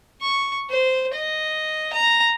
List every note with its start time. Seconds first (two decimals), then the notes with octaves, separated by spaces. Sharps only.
0.22 C#6
0.70 C5
1.13 D#5
1.93 A#5